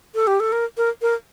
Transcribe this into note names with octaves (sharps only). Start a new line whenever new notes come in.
A4
G4
A4
A#4
A#4
A#4